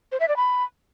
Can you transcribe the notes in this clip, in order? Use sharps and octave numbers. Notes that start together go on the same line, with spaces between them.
C5
E5
D5
B5